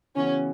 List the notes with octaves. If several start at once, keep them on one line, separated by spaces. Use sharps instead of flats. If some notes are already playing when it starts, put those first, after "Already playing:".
C#3 E3 B3 C#4 F#4